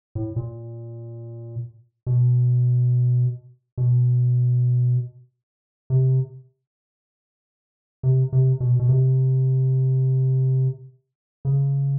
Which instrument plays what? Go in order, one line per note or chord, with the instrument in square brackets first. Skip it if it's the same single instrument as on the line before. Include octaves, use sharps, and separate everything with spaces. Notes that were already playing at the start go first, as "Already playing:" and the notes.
[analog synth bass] A2
A#2
B2
B2
C3
C3
C3
B2
B2
C3
C#3